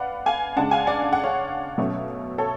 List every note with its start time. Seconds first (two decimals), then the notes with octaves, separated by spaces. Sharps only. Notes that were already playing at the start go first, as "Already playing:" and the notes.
Already playing: B4 D5 F5 F#5
0.26 F5 G#5
0.56 C#3 G#3 D4 F#5 A5
0.71 F5 G#5
0.86 D5 F#5
1.02 F5
1.13 F#5
1.24 C#5 F5
1.77 B2 F#3 A3 C#4
2.38 A4 C#5